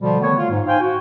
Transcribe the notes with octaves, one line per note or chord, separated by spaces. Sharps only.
B2 D3 F3 G3
D3 D#3 A3 B3 C#5
F4
G#2
D#4 C5 F5 G5 G#5
F#4